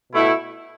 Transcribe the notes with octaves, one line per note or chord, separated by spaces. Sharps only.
B2 A3 E4